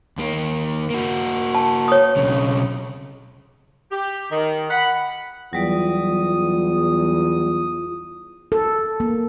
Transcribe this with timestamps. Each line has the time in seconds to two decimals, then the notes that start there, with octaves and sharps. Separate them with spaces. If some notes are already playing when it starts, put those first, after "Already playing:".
0.18 D#2 A#3
0.90 A#3 F#4
1.55 A5
1.88 C#5 D#6
2.16 B1 C#3
3.91 G4
4.31 D#3
4.70 F#5 B5
5.53 E2 F#3 G3 F4 D5 D#6
8.52 A4
9.00 A#3